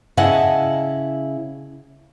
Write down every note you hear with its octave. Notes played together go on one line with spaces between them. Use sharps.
C#3 E4 D#5 F#5 A5